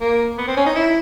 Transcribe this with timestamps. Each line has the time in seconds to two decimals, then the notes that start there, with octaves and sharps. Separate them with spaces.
0.01 A#3
0.38 B3
0.48 C4
0.57 C#4
0.66 D#4
0.76 E4